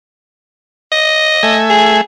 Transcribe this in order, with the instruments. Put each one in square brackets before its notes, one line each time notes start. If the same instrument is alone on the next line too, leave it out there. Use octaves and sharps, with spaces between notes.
[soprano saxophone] D#5
[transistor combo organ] A3 E5 G#5
[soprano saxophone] G#4